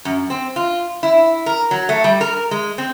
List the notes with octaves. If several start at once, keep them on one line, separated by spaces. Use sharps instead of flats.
F#2
C4
F4
E4
A#4
F#3
A3
G3
A#4
G#3
C4